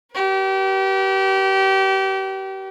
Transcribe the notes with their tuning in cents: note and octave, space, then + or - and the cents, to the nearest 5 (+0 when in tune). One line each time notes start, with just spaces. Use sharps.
G4 -30 B4 -40